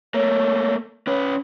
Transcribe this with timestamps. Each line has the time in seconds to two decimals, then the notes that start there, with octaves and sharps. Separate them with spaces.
0.14 A3 A#3 C#5
1.07 C#4 B4 C#5